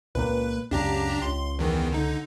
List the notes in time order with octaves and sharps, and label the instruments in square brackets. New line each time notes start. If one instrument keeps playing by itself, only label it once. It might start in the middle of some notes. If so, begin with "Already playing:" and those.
[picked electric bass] C#2 A#2 A#3 [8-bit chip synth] B4
[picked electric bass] C#2 F#2 C#3 [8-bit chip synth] D4 G4 A#5
[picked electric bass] C#2 [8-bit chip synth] C6
[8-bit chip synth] E2 D#3 E3
D3 D#4